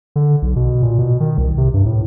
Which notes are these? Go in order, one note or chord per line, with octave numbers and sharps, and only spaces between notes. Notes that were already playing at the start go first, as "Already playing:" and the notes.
D3
B1
B2
A#2
B2
D#3
C2
C3
G2
A2